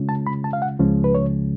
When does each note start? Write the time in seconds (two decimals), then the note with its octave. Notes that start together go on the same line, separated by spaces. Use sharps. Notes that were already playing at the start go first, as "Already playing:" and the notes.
Already playing: C#3 G#3 C#4 F4
0.09 A5
0.27 B5
0.44 A5
0.53 F5
0.62 F#5
0.79 C#2 C#3 F3 G#3 C#4
1.04 B4
1.15 C#5